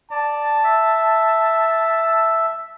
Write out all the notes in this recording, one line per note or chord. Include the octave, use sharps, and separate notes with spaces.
D5 A5
E5